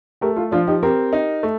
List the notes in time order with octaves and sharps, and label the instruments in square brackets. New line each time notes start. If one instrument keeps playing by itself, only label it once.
[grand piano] A3 [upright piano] G4 A#4
[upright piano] F4 A4
[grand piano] F3 [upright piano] D4 F4
[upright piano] D#4 G4
[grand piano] C4 [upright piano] G4 A#4
[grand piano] D#4
A3